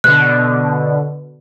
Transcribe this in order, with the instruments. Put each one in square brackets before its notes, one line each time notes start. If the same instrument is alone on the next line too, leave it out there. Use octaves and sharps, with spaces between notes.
[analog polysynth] B2 D3 [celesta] F#6